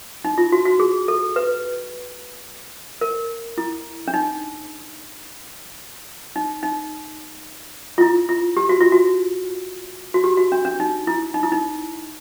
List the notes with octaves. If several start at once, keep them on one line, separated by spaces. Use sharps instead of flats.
D#4
F4
F#4
F#4
G#4
A4
B4
A#4
E4
D4
D#4
D#4
D#4
F4
E4
F4
G4
F#4
F4
F#4
F#4
G4
F#4
D4
D4
D#4
E4
D#4
E4
D#4